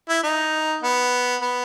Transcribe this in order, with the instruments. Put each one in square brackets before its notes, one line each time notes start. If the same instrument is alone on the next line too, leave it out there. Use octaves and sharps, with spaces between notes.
[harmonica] E4
D#4
B3
B3